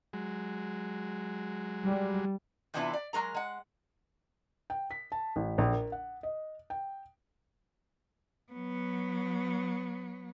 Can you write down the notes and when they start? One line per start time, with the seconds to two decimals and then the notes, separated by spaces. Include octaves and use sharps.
0.13 F#3 G#3
1.85 G3
2.74 C3 E3 B3 D4 E4 F4
2.93 D5
3.13 F#3 G#3 A#4 A#5
3.35 G#3 F#5
4.70 G5
4.91 B6
5.12 A5
5.36 A1
5.58 A#1
5.73 A#4
5.92 F#5
6.23 D#5
6.70 G5
8.52 F#3 B3